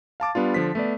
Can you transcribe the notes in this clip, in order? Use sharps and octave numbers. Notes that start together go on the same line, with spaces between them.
F5 A5 D6 A6
G3 B3 D4 F4
D3 F3 B6
A3 B3 D5